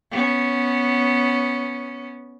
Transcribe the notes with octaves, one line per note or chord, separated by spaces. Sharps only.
B3 C#4